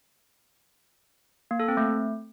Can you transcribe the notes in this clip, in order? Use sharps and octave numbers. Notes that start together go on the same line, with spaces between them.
A#3
A4
C4
A3